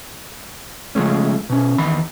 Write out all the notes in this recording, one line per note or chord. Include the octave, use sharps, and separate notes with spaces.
C#3 F3 G#3 A3 C#4
B2 C#4
E2 D#3 B5